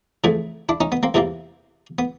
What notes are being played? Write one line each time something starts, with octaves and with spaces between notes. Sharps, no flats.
F2 C#3 E3 A3
D4 E4
C#4 D#4
B3
A#3 C4
E2 C3 E3 G3 A#3
B3